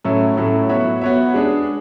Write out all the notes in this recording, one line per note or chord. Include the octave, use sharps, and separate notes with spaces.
A2 F#3 C#4 E4 A4
A2 F#3 C#4 E4 A4
B3 F#4 C#5 E5
B3 F#4 C#5 E5
G#3 D4 G#4